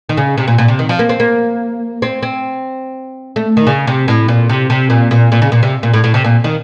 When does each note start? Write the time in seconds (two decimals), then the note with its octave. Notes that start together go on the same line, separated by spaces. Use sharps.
0.09 D#3
0.17 C#3
0.38 C3
0.48 A#2
0.58 A#2
0.68 C3
0.79 D#3
0.89 F3
0.99 A#3
1.09 C4
1.20 A#3
2.02 C4
2.23 C4
3.36 A3
3.57 D#3
3.67 C#3
3.87 C3
4.08 A2
4.28 A#2
4.49 C3
4.70 C3
4.90 A#2
5.11 A#2
5.32 A#2
5.42 C#3
5.52 A#2
5.63 C3
5.83 A#2
5.93 A2
6.04 A2
6.14 C3
6.24 A#2
6.44 D#3